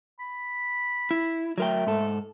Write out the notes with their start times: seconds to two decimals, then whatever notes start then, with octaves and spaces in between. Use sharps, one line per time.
0.19 B5
1.11 E4
1.58 F#3 A3 A#4 G5
1.87 G#2 A4